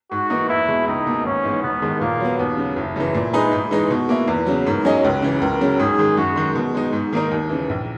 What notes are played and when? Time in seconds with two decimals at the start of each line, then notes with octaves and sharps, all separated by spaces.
0.11 G#2 F#4
0.30 E3 A#3 D#4
0.49 E2 E4
0.68 B2 G#3
0.87 C#2 D#4
1.06 B2 A#3
1.24 G#1 C#4
1.43 G#2 E3 G#3 B3
1.63 E1 B3
1.82 D#2 D#3 G#3
2.00 A#2 A#3
2.20 F#3 B3
2.38 D#2 B3
2.57 C#3 F#3
2.76 F#1 E4
2.96 F#2 C#3 E3
3.14 A#2
3.33 G#3 D#4 G#4 B4
3.52 G#2
3.71 E3 G#3 D#4
3.90 B2 F#4
4.09 A#3 E4
4.28 E2 B4
4.46 C#3 F#3
4.66 G#2 A#4
4.85 F#3 C#4 G#4 D#5
5.03 C#2 B4
5.22 C#3 E3
5.42 C#2 A#4
5.61 C#3 F#3
5.79 G#2 G#4
5.99 D#3 G#3
6.17 F#2 F#4
6.36 D#3 G#3
6.55 B2
6.74 G#3 D#4
6.93 G#2
7.13 D#3 A#3 D#4 A#4
7.31 D#2
7.49 C#3 E3
7.69 A#1